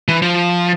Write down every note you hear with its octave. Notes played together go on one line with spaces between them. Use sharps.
E3
F3